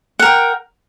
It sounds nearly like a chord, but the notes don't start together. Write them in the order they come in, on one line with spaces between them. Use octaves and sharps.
F#5 A#4 G5